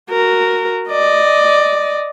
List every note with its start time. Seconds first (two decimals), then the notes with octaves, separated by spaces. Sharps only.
0.10 F#4 A#4
0.90 D5 D#5